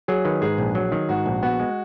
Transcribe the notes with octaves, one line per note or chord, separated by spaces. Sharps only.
F#3 G#4
D#3 B4
G#2 G#4
A#1
F#3
D#3
G#2 F#4
A#1
B3 F#4
G#3